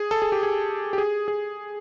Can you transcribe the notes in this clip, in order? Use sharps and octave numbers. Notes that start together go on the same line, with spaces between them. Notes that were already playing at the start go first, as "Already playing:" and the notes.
Already playing: G#4
A4
G#4
G4
G#4
G4
G#4
G#4